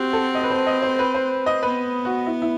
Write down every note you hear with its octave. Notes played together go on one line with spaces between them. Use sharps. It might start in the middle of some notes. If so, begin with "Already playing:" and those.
Already playing: C4 F#4 G4
A4
D#5
B4
C5
D#5
C5
B4
C5
D#5
B3 B4
F#4
E4
E4